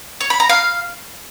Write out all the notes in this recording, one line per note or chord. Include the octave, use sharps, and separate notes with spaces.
C#5
B5
A#5
F5